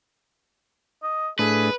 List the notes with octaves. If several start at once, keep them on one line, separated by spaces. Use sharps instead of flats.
D#5
A2 A3 D4 G#4 B4